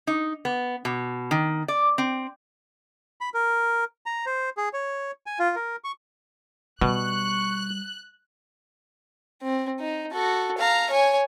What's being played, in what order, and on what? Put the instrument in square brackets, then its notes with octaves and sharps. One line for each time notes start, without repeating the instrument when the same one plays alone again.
[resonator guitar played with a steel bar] D#4
B3
B2
D#3
D5
C4
[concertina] B5
A#4
A#5
C5
G#4
C#5
G#5
F4
A#4
C#6
[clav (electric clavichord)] B2 [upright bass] G3 [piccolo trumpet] C#6 [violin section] F#6
[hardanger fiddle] C4
D#4
F#4 A4
F5 A#5
C#5 G#5